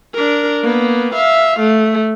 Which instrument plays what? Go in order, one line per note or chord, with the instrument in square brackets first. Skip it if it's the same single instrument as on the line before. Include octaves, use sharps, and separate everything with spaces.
[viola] D4 A#4
A#3 B3
E5 F5
A3